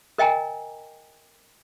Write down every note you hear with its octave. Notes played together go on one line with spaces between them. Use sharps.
A#4 D#5 G5 G#5 A#5